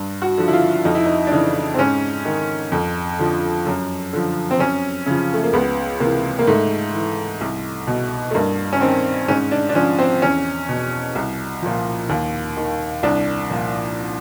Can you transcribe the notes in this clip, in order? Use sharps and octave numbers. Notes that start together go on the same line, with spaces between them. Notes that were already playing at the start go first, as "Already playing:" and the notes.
Already playing: G2
F#4
D3 F3
E4
F4
F2 D#4
E4
D#4
D4
C#3 E3 D#4
C4
G#2 C#4
D#3
F2
D3 F3
F#2
D3 F3
C4
F#2 C#4
C#3 F3
A3
A#3
C#2 B3
C3 E3 A#3
A#3
G#2 A3
E3
C2
B2
A3
G2 A#3
C#4
D#3 C4
G#2 C#4
D4
D4
F3 C#4
C4
E2 C#4
B2
C2
A#2 F3
D#2
D#3
C2 D4
A#2 F3